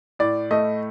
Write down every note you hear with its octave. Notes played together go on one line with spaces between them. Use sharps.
A2 D5
A3 D#5